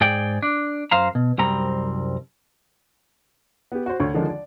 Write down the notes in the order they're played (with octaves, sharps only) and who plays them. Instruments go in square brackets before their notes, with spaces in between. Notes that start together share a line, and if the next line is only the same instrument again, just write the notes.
[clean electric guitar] G#2 G#4 D5 G5
D4
F#2 C5 F5 A#5
B2
C2 F#2 G3 C4 A#5
[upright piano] B3 G4
F#4 C5
D2 D4 C#5 C#6
D3 D#3 F3 G#3 C#4 D4
D5